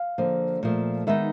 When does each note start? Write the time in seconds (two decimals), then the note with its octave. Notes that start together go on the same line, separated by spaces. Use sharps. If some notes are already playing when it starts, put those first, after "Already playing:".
Already playing: F5
0.18 D3 F3 A#3
0.63 A#2 F3 A3
1.07 D#3 G#3 B3 D#4 E5